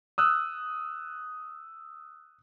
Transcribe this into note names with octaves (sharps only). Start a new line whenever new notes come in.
D#6 E6 F#6